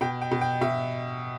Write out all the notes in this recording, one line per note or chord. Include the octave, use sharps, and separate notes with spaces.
B2 G5
G5
B2
G5
B2 E5